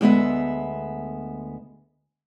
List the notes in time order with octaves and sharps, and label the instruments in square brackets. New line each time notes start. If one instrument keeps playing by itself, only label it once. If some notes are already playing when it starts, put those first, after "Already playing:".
[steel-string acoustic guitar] D2 G#3 B3 E5